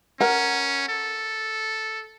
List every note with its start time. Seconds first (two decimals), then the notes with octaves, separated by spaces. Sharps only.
0.20 C#4 A#4 F#5
0.89 A4